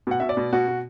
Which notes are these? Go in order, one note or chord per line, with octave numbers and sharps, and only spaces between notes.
B2 F#5
B2 E5
D5
B2
B2 F#4
B2